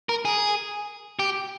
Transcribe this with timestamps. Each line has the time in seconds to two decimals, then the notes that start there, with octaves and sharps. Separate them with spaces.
0.09 A#4
0.25 G#4
1.19 G4